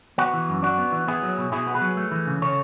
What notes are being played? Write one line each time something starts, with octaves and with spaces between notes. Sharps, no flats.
B3 F#4
E3
F#2
D4 F#4
B3
E3
B3 E4 G#4
F#3
B2
B2 E4 G#4
B3
G#4 B4
F#3
A3
E3
C#3
C#3 A4 C#5